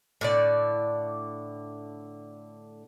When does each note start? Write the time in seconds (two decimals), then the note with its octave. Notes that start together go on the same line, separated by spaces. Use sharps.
0.21 A2 D3 D5